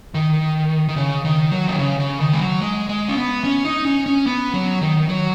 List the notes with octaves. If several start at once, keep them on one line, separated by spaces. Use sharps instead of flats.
D#3
D#3
C#3
D#3
F#3
D#3
C#3
C#3
D#3
G#3
F#3
G#3
G#3
C#4
B3
C#4
D#4
C#4
C#4
B3
F#3
D#3
F#3